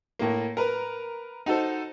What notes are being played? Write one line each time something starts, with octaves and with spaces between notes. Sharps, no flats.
A2 A#3
A#4 B4
D#4 F#4 A4 C5